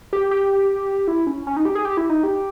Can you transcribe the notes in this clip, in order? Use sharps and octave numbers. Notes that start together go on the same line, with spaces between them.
G4
G4
E4
C#4
C#4
D#4
G4
G#4
G4
E4
D#4
G4